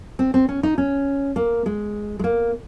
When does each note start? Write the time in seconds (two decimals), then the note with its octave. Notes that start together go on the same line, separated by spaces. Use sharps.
0.19 C4
0.34 C4
0.49 C#4
0.63 D#4
0.78 C#4
1.36 A#3
1.66 G#3
2.19 G#3
2.24 A#3